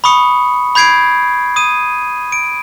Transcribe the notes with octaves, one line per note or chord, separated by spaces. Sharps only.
B5 C#6 D#6 C#7
B5 G6 G#6 C7 D7
D#6 D#7
D7